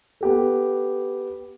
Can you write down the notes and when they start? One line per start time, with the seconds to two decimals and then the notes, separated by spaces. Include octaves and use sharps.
0.21 B3 G4 A4